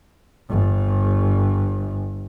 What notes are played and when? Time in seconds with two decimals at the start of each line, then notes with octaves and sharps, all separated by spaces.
0.49 G1 G2